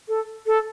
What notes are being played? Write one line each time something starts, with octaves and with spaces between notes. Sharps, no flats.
A4
A4